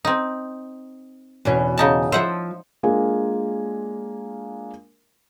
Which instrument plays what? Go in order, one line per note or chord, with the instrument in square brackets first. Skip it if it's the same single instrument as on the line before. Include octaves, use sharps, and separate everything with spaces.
[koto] C4 D#4
[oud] E2 B2 C#4
[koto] C#3 D#4 A5
[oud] F3 E5 [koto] C5 F#5
[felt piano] G#3 A#3 D4 F4 A#4 G#5